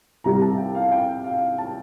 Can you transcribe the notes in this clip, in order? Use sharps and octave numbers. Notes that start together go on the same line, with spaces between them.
C2 C3 G3 A#5
A5
G5
F5
G5
F5
A5